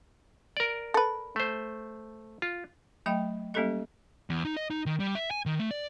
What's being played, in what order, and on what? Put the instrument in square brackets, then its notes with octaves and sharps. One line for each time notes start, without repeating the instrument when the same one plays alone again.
[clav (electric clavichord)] A#4 D5
[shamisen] A4 B4
[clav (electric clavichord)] A3 C5
F4
[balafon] F#3 A3 D#5 E5 G5 B5
G3 A#3 C#4 G4 A4 D#5
[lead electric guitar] E2
D#4
D#5
D#4
D#3
G3
E5
G#5
D#3
A3
D5